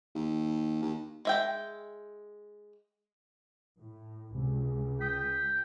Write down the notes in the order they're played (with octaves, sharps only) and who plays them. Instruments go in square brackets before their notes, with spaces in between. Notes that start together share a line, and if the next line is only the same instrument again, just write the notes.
[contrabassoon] D#2
D#2
[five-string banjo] G#3 E5 G5
[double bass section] A2
[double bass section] C#2 [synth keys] C3
[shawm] G5 [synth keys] D#6 B6